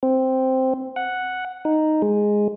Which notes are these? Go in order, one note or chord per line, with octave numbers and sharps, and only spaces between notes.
C4
F#5
D#4
G#3